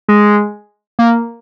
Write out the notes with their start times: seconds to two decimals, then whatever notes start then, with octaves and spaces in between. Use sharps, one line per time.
0.08 G#3
0.99 A#3